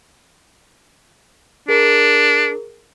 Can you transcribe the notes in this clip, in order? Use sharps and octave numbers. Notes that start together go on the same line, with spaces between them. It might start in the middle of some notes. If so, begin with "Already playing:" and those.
D4 G#4 A#4